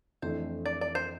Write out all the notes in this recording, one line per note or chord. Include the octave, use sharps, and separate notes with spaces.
F2 E3 A3 D4 C5
D5
D5
C5